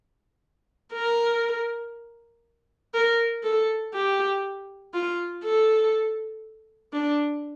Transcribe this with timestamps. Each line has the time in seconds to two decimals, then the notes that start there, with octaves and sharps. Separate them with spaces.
0.93 A#4
2.94 A#4
3.43 A4
3.94 G4
4.94 F4
5.44 A4
6.93 D4